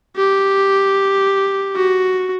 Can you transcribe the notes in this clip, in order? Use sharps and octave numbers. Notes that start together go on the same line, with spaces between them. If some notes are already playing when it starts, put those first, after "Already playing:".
G4
F#4